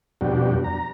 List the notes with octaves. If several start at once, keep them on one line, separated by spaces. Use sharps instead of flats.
F2 B2 G3 D4 F#4 G4
A#5